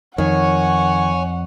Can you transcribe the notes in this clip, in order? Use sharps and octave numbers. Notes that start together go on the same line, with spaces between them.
F2 D#3 C#5 F#5 G#5